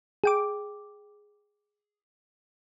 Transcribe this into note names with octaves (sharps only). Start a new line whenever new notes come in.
G#4 G5 D6